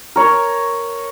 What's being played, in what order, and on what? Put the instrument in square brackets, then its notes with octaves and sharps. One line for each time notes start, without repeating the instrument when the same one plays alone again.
[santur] A#4 C#5